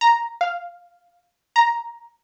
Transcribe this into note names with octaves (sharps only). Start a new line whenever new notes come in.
A#5
F5
A#5